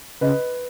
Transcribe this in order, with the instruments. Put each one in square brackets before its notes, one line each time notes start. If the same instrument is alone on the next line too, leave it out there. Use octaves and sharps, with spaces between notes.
[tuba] C#3 [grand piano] B4 D#5